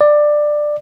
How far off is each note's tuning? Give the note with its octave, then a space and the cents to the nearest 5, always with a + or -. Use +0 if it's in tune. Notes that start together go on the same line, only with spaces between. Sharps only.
D5 +15